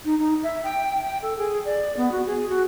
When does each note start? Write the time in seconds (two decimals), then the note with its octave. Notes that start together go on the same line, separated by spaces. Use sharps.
0.05 D#4
0.18 D#4
0.43 E5
0.63 G5
1.03 G5
1.22 A4
1.38 G#4
1.65 D5
1.97 B3
2.12 F#4
2.26 G#4
2.49 F#4